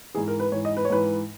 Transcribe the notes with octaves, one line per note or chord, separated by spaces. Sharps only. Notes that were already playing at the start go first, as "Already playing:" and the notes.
G#2 E3 G#4
A#4
B4
G#2 E3 C#5
D#5
B4
C#5
G#2 E3 B4